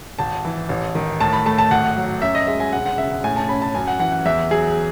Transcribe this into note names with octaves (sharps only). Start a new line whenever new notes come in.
G#1 A5
E3
A1
D#3
A2 A5
B5
A3 A5
A5
G#1 F#5
F#3
F#2 E5
D#5
G#3 E5
G#5
E1 F#5
F#5
C#3 E5
F#5
A2 G#5
A5
C#4 B5
A5
F#2 G#5
F#5
E3 F#5
F#5
E2 E5
F#3 G#4